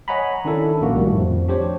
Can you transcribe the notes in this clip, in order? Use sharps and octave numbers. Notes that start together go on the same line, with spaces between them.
C#5 D#5 F#5 G#5 A#5 B5
D#3 C#4 D4 E4 A4
A#1 A#3 F#4
A2 D#3 G3 A3
F2 F3
D4 G4 C5 C#5